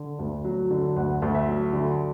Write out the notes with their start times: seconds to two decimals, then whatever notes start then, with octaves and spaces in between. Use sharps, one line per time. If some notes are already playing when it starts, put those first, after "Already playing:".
Already playing: D3
0.19 D2
0.44 F#3
0.71 D3
0.96 D2 F#5
1.22 D2
1.34 E5
1.47 F#3
1.73 D3